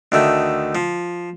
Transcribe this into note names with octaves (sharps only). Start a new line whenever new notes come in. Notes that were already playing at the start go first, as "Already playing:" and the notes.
D2 D#3 A3
F3